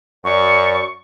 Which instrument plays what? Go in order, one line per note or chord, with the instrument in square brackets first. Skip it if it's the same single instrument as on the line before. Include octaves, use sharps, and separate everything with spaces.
[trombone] F#2 [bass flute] D5 [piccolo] C#6